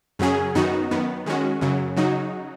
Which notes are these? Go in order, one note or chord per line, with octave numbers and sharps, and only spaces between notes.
F#2 C#3 F#3 C#4 G#4
F#2 D#3 B3 D#4 F#4
F#2 D#3 B3
D#3 G#3 C#4 F#4
F#2 C#3 F#3
C#3 F#3 D#4 F#4